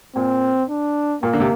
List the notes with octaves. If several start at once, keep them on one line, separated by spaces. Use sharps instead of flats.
A#2 C4
D4
A#2 A#3
D3
C3